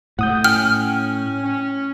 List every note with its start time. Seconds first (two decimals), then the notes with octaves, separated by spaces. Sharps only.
0.19 A2 F#5 D#6 G6
0.44 C#4 G5 F6
1.43 C#4